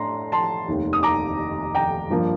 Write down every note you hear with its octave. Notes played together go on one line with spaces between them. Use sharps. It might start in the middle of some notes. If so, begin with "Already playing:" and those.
Already playing: A2 D4 A#5 C6
A5 C6
F1 D#2 D#3
D#6
A#5 D6
G5 A#5
G2 F3 A#3 D4